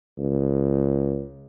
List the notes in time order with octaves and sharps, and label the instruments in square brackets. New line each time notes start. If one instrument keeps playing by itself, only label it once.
[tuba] C#2